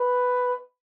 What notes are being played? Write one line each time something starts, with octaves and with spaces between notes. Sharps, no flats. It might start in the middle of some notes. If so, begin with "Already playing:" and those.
Already playing: B4